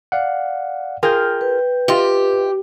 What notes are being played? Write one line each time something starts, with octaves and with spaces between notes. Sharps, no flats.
D5 F5 F#5
F4 G#4 A#4 G5 G6
B4
F4 G4 D#5 E5